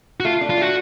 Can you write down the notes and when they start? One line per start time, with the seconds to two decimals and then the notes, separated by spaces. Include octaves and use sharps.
0.20 F#4
0.25 A3 F4
0.41 D4
0.50 F4
0.57 A3 F#4